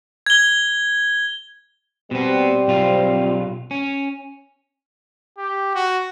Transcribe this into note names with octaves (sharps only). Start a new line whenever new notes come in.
G#6 G7
B2 G3 B3 C4
B1 F4
C#4
G4
F#4